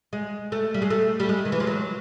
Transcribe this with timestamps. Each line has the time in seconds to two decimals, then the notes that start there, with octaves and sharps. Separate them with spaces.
0.13 G#3
0.52 A3
0.74 G3
0.82 G#3
0.90 A3
1.20 G3
1.29 G#3
1.45 D#3
1.52 E3
1.60 F3
1.67 F#3